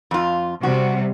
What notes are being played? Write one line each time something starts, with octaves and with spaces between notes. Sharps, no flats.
F2 F4
C3 G3 F#4